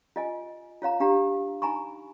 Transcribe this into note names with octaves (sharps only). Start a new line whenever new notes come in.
F4 D#5 G#5
F4 C#5 F5 A#5
D4 G4 F5 A#5
D#4 G#5 A#5 B5 C#6